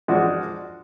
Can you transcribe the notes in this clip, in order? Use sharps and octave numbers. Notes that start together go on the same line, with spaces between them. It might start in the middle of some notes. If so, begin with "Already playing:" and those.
F3 G#3 D4 F#4